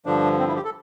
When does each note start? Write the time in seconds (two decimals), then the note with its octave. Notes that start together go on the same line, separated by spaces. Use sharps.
0.06 G2 D3 F3 D4
0.39 C4
0.48 E4
0.55 G4
0.64 A4